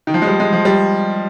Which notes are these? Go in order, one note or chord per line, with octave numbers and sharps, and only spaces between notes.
D#3
F3
G#3
G3
G#3
F3
G3